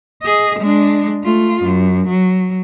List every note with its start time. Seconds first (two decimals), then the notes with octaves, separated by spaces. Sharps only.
0.22 G#4 D#5
0.60 G#3 D4
1.24 A3 F4
1.63 F#2
2.08 F#3